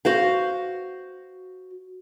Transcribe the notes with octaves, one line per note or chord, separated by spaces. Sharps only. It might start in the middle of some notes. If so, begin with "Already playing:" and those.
F#4 C5 F5